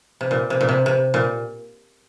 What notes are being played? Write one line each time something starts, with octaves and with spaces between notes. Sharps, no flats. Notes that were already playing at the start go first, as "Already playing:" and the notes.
C3
A#2
C3
A#2
C3
C3
A#2